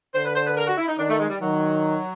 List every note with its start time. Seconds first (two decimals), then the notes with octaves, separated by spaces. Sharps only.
0.15 D3 C5
0.25 B4
0.36 C5
0.47 B4
0.57 A#4
0.67 F#4
0.78 E4
0.88 D#4
0.98 D#3 D4
1.09 A3
1.20 G#3
1.30 G3
1.40 D#3 F#3